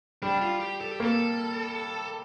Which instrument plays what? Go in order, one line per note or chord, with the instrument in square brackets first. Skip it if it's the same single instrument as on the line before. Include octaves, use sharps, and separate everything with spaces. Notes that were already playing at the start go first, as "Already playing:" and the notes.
[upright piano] G3 [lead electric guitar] D4
[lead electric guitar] F4
G4
A4
G4
[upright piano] A#3 [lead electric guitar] A4